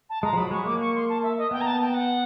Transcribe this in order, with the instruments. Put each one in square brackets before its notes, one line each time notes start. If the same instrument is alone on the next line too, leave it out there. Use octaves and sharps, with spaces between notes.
[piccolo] A5
[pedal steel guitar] G#3 [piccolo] A#5
[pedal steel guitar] F3
[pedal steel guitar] F#3 [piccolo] B5
[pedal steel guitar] G#3 [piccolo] C#6
[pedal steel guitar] A#3 [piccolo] D6
[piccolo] C#6
C6
A5
E5
D#5
[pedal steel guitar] B3 [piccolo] G5
[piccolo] A#5
A5
G5
F#5